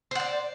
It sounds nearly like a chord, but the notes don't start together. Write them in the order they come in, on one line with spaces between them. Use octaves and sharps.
C5 F#5 D5